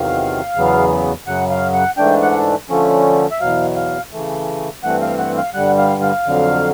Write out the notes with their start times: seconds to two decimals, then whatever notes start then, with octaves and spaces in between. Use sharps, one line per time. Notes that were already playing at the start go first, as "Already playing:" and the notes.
Already playing: E2 C3 D#3 F#3 F5
0.56 E2 C#3 F#3 B3
1.27 F#2 C#3 F#3 F#5
1.51 F5
1.74 F#5
1.97 G#2 E3 A3 D4 G5
2.22 F#5
2.69 D3 F3 A3 C#4
3.31 E5
3.40 E2 B2 F#3 F5
3.76 F5
4.12 C#3 E3 A3
4.83 G2 E3 A3 C4 F#5
5.01 F5
5.19 F#5
5.37 F5
5.54 G2 D3 G3 F#5
5.78 F5
6.02 F5
6.26 F2 D3 F#3